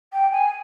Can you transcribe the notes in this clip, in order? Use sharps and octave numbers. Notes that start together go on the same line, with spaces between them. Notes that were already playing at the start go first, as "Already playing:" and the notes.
G5
G#5